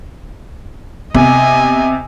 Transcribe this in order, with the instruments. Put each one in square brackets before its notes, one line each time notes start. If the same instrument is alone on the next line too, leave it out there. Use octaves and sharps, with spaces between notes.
[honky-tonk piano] C3 [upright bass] B3 [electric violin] D#5 G#5